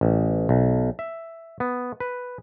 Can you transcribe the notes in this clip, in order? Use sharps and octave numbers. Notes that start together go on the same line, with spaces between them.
A1
B1
E5
B3
B4